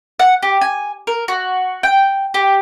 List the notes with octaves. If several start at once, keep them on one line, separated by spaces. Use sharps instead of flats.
F#5
G4
G#5
A#4
F#4
G5
G4